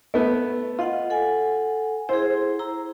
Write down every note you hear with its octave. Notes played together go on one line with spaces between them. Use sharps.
A3 B3
F4 D#5 F#5
A4 F#5 G#5
E4 G#4 C5
E4 A#5